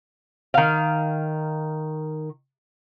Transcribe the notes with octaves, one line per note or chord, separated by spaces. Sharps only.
D#3 F5